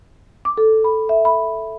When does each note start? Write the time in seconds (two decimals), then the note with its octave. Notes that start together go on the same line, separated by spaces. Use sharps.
0.45 D6
0.58 A4
0.84 B5
1.09 E5
1.25 B5